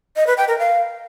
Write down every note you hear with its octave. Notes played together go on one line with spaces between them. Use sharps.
D#5
B4
G5
A#4
F5